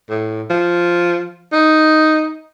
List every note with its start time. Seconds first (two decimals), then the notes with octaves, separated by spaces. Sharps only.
0.10 A2
0.50 F3
1.53 D#4